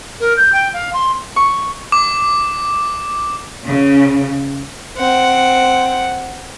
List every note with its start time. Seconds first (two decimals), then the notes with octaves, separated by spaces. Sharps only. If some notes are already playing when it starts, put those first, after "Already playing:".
0.20 A#4
0.37 G6
0.53 G5
0.73 F5
0.93 C6
1.36 C#6
1.92 D6
3.66 C#3
4.97 C4 F#5